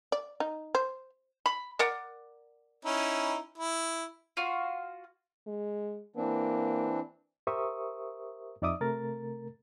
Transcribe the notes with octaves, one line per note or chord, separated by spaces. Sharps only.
D5
D#4
C5
B5
A#4 D5 F#5
C#4 D#4 E4
E4
F4 F#4 C6
G#3
E3 A#3 C4 D4
G4 A#4 C5 E5 C#6 D#6
F2 D#4 D5 E5 D6 D#6
C3 A3 A#4 A6